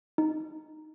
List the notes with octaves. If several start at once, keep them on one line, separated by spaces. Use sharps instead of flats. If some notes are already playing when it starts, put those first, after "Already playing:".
D#4